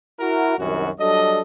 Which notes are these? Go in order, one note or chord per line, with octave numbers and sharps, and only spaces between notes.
E4 F#4 A#4
C2 F#2 D#3 F#4
F#3 G3 D4 A4 D#5